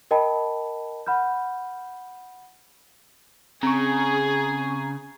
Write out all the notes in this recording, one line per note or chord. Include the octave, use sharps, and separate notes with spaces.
A#4 D#5 G5 A5 B5
F#5 B5 F6 G6
C#3 C4 G#4 A#5 C#6